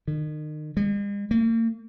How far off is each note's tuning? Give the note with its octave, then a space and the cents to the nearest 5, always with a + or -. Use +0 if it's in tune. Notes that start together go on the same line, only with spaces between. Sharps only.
D#3 -35
G#3 -45
A#3 -40